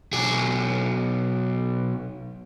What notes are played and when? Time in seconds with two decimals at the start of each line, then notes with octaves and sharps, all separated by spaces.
0.13 B1 G#4